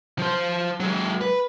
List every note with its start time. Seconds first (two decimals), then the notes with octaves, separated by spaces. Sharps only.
0.19 F3 C5
0.80 F#3 G#3
1.21 B4